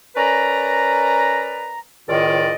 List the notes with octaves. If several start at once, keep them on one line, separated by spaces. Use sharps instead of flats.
C#4 A#4 B4 D5 A#5
C#2 A2 D#3 F4 D5 D#5